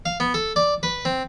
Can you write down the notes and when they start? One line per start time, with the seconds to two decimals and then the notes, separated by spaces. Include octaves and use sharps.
0.06 F5
0.20 B3
0.34 A4
0.56 D5
0.83 B4
1.05 C4